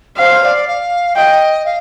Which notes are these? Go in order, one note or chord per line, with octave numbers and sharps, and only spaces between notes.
C5 F5
D5
F5
D#5 G5
F5